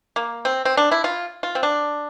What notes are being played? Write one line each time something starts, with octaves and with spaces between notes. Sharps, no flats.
A#3
C4
C4
D4
E4
F4
F4
C4
D4